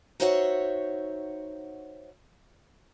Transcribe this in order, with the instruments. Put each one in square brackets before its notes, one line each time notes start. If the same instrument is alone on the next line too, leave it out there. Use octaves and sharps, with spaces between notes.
[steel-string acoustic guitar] D#4 F#4 C5 C#5 E5 F#5